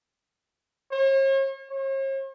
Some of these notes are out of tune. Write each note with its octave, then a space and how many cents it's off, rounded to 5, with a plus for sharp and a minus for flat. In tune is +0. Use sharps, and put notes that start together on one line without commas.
C#5 -45
C#5 -45